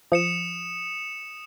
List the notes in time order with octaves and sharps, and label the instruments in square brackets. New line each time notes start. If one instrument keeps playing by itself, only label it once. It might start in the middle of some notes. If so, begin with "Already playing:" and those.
[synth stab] F3 [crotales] D#6 C#7 E7